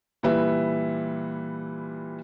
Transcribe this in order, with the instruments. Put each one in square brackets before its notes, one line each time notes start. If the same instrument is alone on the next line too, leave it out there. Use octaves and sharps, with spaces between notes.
[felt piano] A#2 E3 G3 B4 E5